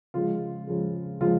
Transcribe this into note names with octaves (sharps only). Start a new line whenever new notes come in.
C#3 F3 G#3 F4
C#3 F3 G#3
C#3 F3 G#3 F4